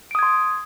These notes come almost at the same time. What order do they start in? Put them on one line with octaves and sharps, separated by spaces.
D7 D#6 G#6 C6